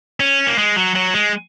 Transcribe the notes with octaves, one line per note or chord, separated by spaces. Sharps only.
C#4
A#3
G#3
F#3
F#3
G#3